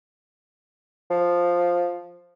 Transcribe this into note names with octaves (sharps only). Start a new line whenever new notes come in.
F3